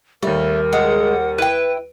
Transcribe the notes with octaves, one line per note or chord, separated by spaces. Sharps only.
D#2 G3 A3 A#4
G#3 F#5
E4 B4 G5